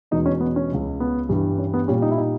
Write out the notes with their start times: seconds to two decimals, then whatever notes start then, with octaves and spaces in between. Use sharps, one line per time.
0.11 E2 B2 G#3 D#4
0.26 C#4
0.40 B3
0.56 C#4
0.71 C#2 C#3 G#3
1.00 B3
1.29 G2 E3 G3
1.58 C#4
1.74 B3
1.88 A#2 G3 C#4
2.02 D#4
2.11 E4
2.18 D#4